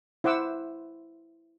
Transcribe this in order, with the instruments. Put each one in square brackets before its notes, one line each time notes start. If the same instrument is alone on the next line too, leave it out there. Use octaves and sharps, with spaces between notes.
[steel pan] E4 C5 F#5 D6 E6